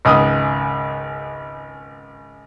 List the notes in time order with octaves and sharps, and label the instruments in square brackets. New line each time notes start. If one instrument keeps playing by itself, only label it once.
[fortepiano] G#1 C#2 D#6